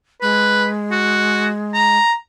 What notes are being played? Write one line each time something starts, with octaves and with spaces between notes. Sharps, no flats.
G#3 B4
F#4
A#5